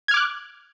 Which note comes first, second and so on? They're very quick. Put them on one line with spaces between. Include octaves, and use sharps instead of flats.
G#6 F6 D6 F#6